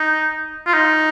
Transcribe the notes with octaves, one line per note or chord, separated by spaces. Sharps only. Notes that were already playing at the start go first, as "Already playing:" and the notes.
Already playing: D#4
F4
D#4